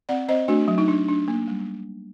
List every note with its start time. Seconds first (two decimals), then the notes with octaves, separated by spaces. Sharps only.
0.09 C4 D5 F#5
0.28 C4 C5 D#5
0.48 A3 D4 F#4
0.68 F#3
0.78 D#4
0.88 D4
1.08 D4
1.28 A#3
1.48 G3